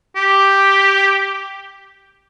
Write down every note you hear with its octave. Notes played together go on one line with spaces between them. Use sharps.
G4